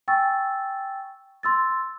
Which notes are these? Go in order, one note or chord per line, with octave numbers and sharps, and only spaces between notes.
G5 G#5 C#6 E6 A6
C6 E6 A6